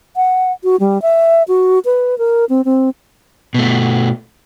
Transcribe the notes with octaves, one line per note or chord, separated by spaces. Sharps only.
F#5
F#4
G3
E5
F#4
B4
A#4
C4
C4
B2 A3